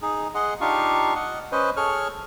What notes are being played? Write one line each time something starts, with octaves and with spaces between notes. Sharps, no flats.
D#4 G#4
G#4 D#5 F#5 C6
D4 D#4 F4 G4 F5 C#6
D#5 F#5
C#4 B4 C5 D#5
G#4 A4 C#5 C#6 F6